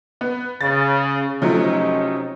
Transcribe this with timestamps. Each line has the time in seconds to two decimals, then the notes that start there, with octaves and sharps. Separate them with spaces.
0.21 B3
0.61 C#3 A6
1.42 C3 F3 F#3 A3 C#4 D#4